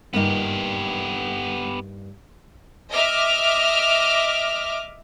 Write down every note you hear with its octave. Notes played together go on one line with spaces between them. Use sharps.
G2 A#3 B3 D#4 G4
D#5 E5 D6 F6